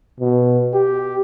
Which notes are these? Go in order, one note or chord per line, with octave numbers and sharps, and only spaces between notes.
B2
G4